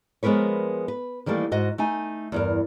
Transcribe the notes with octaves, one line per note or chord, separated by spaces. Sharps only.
F3 G#3 B3 A#4 B4 C#5
B4
D#3 E3 G3 A3 A#3
G#2 F#4 D#5
A3 D#4 G#5
E2 G2 A#4